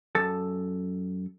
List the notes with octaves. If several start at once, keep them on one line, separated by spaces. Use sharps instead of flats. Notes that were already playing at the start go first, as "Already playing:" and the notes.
F#2 A4 A5